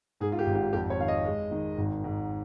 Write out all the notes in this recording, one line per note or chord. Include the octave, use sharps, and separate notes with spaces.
G#2 G#4
F4
G4
G#1
G4
F2 G4
C#5
D#3 F5
D#5
G#3
D#3
G#1
G#2